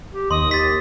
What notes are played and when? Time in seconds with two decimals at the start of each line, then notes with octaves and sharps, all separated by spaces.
0.13 G4
0.31 D#2 D#5 C6 D#6
0.51 G4 A6 B6